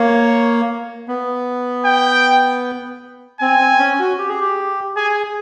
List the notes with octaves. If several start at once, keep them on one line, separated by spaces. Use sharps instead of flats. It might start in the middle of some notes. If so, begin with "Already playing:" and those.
Already playing: A#3 C#5
B3
G5
C4 G#5
C4
C#4
F#4
G4
G#4
G4
G#4 G#5